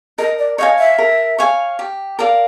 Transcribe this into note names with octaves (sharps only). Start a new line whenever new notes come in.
A#4 D#5
D5
C#5 D#5 F5 G#5
E5
A#4
C#5 F5 G#5
G4
A#4 D5 F5